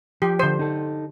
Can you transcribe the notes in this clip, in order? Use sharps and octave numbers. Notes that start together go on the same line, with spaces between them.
F3 G4
D3 C5
D#4 A4